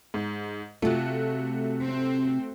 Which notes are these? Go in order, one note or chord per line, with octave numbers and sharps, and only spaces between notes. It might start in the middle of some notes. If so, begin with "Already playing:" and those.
G#2
C3 A3 F4 F#4
C4